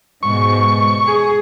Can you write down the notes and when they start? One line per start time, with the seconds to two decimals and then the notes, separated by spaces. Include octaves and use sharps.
0.23 G#2 B2 C#6
1.06 G#4